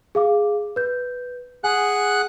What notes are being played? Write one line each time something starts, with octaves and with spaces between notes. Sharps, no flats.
G#4 F5 D6
B4 G6
G#4 F#5 G#5 F#6